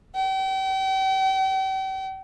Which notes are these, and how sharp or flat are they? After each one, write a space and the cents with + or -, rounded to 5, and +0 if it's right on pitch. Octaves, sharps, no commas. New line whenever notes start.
G5 -40